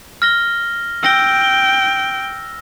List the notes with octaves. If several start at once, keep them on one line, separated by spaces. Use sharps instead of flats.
F6 A#6 G7
G5 E6 A#6 G7